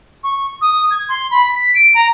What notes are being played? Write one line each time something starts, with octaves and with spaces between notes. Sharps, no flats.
C#6
D#6
G#6
C6
B5
B6
D7
A#5